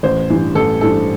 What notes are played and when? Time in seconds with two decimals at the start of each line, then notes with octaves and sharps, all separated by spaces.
0.03 A1 C5
0.30 G2 E3
0.55 A1 A4
0.81 G2 E3 A4